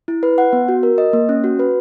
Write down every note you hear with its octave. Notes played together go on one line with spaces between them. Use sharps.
E4
B4
F#5
B3
F#4
A#4
D#5
A#3
C#4
F#4
B4